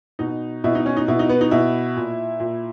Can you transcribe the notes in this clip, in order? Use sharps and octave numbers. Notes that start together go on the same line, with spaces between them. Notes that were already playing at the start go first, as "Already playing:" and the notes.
B2 D#4
B2 E4
D#4
C#4
D#4
B2 E4
D#4
B3
D#4
B2 E4
A#2
A#2